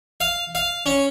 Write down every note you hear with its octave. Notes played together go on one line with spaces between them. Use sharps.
F5
F5
C#4